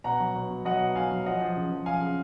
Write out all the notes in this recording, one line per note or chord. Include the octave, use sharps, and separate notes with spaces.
B2 F#5 A#5
F#3
B2
F#3
F#3 D#5 F#5
B2
F#3 F5 G#5
F#3
F3 D#5 F#5
F3
C#3
F3
F3 F5 G#5
C#3